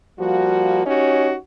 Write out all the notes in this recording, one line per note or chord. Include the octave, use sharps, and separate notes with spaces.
F3 G3 A#3 F#4
C#4 D#4 F#4 G4 C#5